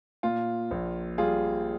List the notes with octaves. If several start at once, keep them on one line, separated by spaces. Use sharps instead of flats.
A#2 F4
A#1
G3 F4 G#4